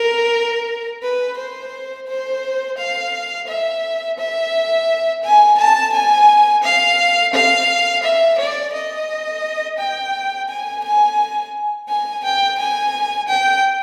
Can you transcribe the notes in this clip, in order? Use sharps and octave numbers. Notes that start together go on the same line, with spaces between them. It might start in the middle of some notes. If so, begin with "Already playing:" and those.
Already playing: A#4
B4
C5
C5
F5
E5
E5
G#5
A5
G#5
F5
F5
E5
D5
D#5
G5
G#5
G#5
G#5
G5
G#5
G5